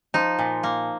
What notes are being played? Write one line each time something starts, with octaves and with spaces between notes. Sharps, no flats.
F3 D#4
A#2
A#3